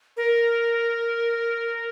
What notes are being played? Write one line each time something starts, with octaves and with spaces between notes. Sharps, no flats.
A#4